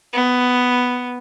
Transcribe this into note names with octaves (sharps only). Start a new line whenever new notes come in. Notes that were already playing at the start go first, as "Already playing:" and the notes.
B3